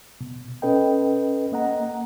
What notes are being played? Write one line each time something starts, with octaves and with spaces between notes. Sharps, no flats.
B2
C#4 A4 B4 D#5 G5
A#3 D#5 F#5 A#5